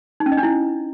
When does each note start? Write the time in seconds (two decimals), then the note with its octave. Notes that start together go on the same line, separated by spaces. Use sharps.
0.20 D#4
0.26 C#4
0.32 D#5
0.37 D4
0.43 E4